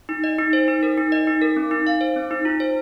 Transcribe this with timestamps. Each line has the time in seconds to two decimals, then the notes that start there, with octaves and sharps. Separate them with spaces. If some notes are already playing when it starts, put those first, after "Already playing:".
0.09 D#4
0.24 D#5
0.39 D#4
0.53 C5
0.68 D#4
0.83 A#4
0.98 D#4
1.12 D#5
1.27 D#4
1.42 A#4
1.56 C4
1.71 D#4
1.87 F5
2.01 C5
2.16 C4
2.31 D#4
2.45 F4
2.60 C5